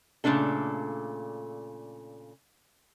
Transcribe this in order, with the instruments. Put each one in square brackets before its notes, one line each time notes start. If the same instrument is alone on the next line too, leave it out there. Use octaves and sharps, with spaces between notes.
[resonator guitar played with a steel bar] A#2 C#3 G#3 A3 D4 A4